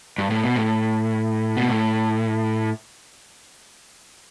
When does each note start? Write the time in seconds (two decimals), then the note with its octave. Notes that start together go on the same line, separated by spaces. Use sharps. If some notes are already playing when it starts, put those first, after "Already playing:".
0.18 G2
0.30 A2
0.44 B2
0.56 A2
1.57 B2
1.69 A2